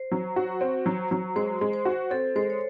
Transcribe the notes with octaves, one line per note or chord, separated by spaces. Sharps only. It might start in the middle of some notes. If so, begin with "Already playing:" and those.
Already playing: C5
F#3
F#4
C4
F#3
F#3
G#3 C5
G#3
C5
F#4
C4 A4
G#3 C5
C#5